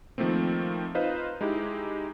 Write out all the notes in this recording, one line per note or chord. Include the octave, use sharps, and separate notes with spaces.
D#3 F3 A3 A#3 C4
D#4 F4 B4 C5 D#5 F5
G#3 D#4 E4 G4